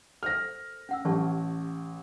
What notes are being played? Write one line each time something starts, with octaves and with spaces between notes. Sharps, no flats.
A4 A#4 C5 F6 A#6
C#4 F#5 E6
A1 G4 A5 C#6